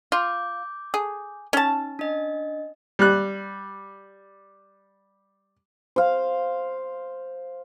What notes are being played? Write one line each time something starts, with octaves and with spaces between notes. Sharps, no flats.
F4 D6 G6
G#4
C#4 D#4 A5
D4 D#5
G3 F#6
C5 F5